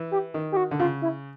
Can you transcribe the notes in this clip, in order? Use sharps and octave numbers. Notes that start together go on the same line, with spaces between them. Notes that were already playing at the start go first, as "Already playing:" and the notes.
Already playing: E3
G4
D#3
G4
F#4
D3
C#3 F4
E4